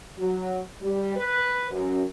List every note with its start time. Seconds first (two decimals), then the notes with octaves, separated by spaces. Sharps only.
0.18 F#3
0.80 G3
1.16 B4
1.71 F#2